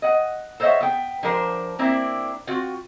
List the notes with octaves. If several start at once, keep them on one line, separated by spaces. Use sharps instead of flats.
D#5 F#5
A4 C5 C#5 D#5 E5 F#5
B3 G5
F3 D4 A#4 C5
A#3 C4 D4 E4
C4 F4 F#4